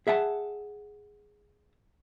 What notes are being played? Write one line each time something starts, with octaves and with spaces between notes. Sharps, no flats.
G#4 E5 F#5 A5